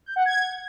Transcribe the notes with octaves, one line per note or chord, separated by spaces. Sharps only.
G6
F#5
G#6